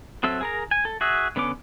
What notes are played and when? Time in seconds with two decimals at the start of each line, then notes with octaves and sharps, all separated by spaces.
0.23 F#3 C4 A4 E5
0.41 G#4 A#4 A#5
0.71 G#5
0.85 A4
1.01 F#4 G#4 E5
1.36 D3 B3 C#4 D6